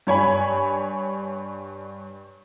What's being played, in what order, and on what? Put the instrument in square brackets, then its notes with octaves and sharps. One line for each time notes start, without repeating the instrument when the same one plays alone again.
[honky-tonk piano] G2 C#5 G#5 B5